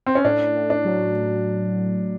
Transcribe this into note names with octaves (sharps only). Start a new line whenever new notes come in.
C4
C#4
A2 D4
A2
D4
F#3